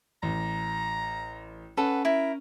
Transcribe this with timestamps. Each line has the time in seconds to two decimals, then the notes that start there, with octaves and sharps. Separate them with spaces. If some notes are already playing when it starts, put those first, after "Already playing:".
0.23 A1 A#5
1.77 C#4 A4 B4 F#5
2.05 E4 A#4